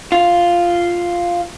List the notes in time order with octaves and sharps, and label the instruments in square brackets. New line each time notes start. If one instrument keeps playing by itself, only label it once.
[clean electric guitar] F4